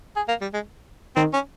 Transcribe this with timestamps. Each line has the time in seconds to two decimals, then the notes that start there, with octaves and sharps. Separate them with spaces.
0.16 G#4
0.28 A#3
0.41 G3
0.53 G#3
1.16 D#3 C4
1.33 C#4